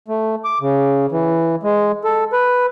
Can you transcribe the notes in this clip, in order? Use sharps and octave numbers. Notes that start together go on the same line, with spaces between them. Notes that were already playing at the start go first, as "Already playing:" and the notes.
A3
D6
C#3
E3
G#3
A4
B4